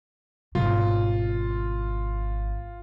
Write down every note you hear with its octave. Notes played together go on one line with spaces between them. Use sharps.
G#1 B2 F4